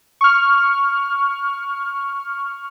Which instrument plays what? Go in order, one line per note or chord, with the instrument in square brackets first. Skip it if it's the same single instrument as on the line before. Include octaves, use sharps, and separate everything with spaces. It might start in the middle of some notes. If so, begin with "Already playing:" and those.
[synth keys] C#6 F6